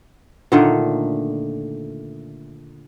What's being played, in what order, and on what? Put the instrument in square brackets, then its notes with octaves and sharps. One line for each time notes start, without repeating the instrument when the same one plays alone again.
[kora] A#2 D3 D#3 A3